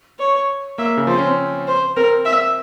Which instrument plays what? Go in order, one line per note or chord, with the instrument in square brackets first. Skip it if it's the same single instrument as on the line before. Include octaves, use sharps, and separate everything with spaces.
[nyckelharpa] C#5
[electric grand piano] A#3 [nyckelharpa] E5
[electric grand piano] C#3
[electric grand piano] F3 [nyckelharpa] C5
[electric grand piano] C4
C#4
C4
[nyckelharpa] C5
[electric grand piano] C4 [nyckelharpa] A#4
[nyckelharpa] E5